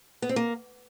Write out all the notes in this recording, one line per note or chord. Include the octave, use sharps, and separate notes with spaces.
B3
C4
A#3